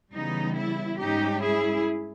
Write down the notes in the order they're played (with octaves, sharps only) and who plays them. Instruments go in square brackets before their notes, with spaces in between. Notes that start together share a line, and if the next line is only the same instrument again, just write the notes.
[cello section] C#3 E3 G3 B3 D#4
E4
G#2 G3 C#4 D#4 G4
E4 G#4